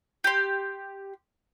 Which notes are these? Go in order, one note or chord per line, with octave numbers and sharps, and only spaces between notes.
G4 C6